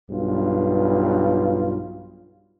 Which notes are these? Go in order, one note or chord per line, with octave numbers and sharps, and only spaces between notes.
B1 G2 F4